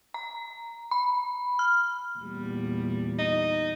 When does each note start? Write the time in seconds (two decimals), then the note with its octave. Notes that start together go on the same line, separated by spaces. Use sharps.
0.14 A#5
0.91 B5
1.59 F6
2.19 E2 A#2 G3
3.19 D#4